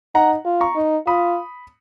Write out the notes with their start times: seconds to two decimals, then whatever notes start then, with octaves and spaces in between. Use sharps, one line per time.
0.15 D#4 F#5 A#5
0.45 F4
0.61 A#5 C#6
0.76 D#4
1.07 F4 B5 D#6